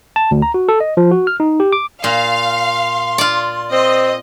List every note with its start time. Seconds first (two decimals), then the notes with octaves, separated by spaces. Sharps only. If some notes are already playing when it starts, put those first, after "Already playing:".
0.16 A5
0.31 D2
0.42 A#5
0.54 F#4
0.69 A4
0.80 D#5
0.97 F3
1.11 F#4
1.27 F6
1.40 D#4
1.60 G4
1.73 D6
2.04 A#2 F5 C6
3.18 F4 D5
3.72 C4 D#5